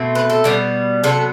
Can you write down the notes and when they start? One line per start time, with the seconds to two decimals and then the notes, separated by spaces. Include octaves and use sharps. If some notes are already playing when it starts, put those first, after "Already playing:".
Already playing: B2 A3 C4
0.15 B4
0.30 A4
0.44 B2 G3 B3
1.03 C3 F#3 B3 A4